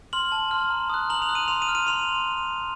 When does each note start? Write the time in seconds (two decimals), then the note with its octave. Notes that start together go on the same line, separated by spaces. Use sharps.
0.13 C6 F6 F#7
0.32 A5
0.51 C6 F6
0.70 A#5
0.90 D#6 F#6
1.10 A#5 F#7
1.22 F7
1.29 D#6 F#6
1.35 D#7
1.48 C6 F7
1.62 D#7
1.68 F6
1.75 D#7
1.87 C6 F7